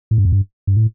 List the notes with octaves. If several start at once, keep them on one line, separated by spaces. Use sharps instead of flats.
A2
G2
F2
G2
G2
A2